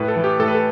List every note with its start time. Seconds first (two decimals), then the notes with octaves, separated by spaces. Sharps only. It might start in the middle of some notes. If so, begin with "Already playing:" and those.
Already playing: A2 B4
0.08 A4
0.16 E3 A3
0.24 G4
0.39 A2 A4
0.48 B4
0.55 A4